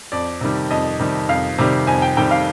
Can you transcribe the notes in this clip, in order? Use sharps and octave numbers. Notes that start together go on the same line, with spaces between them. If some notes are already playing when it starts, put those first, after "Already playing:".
F2 D5
C3 D#3 G3
F2 D#5
C3 D#3 G3
F2 F5
C3 D#3 G3
F2 G#5
G5
C3 D#3 G3 G5
F5